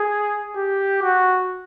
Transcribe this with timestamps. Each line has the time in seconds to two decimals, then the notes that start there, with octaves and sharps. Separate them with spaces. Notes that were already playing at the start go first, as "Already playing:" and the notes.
Already playing: G#4
0.56 G4
1.02 F#4